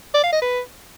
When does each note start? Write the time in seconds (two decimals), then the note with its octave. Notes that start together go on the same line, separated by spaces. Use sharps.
0.14 D5
0.23 F5
0.33 D#5
0.42 B4